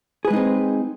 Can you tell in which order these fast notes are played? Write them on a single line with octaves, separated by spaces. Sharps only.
G#4 B4 G#3 D#4 C4